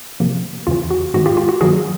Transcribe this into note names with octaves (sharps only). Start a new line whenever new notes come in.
C3 F3 A#3
E2 C#3 E3 F4
F#4
G#2 D#3 G#3 B3 F#4
F4 G4
F4 G4
F#4
G2 D#3 F#3 A#3 F#4 G#4